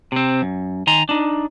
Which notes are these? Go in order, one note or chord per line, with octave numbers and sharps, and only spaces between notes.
C3 C4
F#2
D#3 G#5 A#5 C6
D4 D#4